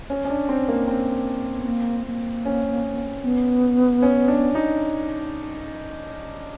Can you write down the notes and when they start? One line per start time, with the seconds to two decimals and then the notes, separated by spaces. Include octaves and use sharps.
0.10 C#4
0.25 C#4
0.30 D4
0.49 C4
0.69 A#3
0.88 C4
1.58 B3
1.67 A#3
2.07 A#3
2.45 C#4
3.23 B3
4.02 C#4
4.28 D4
4.55 D#4